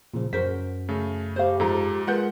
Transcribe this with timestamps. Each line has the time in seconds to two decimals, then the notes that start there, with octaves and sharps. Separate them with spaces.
0.14 A#2 C#3 F3
0.33 F#2 F#4 A#4 C5 B6
0.89 C#3 A3
1.36 G4 C5 F5
1.60 G#2 F3 A4 A#5
2.07 G#3 F4 A#4 B4 F#5 G6